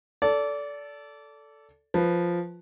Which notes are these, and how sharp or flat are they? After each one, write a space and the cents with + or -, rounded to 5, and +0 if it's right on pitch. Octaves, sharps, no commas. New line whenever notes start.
A4 +0 D5 -25
F3 +0 B4 +0